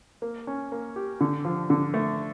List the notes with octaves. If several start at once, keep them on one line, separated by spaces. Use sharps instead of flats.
A#3
C#4
A#3
G4
D3
F3
D3
A3